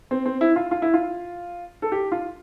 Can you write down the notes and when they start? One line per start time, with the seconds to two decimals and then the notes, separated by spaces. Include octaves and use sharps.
0.11 C4
0.26 C4
0.41 E4
0.56 F4
0.71 F4
0.82 E4
0.94 F4
1.82 A4
1.92 G4
2.12 F4